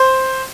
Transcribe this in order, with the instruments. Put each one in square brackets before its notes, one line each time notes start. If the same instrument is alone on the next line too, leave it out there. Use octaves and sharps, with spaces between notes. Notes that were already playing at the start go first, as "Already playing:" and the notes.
Already playing: [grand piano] C5